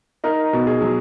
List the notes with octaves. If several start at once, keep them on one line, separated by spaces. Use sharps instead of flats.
D#4 A#4
B2
G#4
F#3